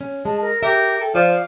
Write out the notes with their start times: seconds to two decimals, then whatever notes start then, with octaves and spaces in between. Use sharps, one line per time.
0.01 C#4
0.25 G#3 A5
0.41 A#4
0.62 G4 A#4 E5
1.01 A4 G5
1.15 F3 F4 D5 F5